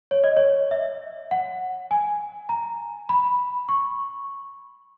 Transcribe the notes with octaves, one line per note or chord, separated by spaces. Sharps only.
C#5
D#5
C#5
E5
F#5
G#5
A#5
B5
C#6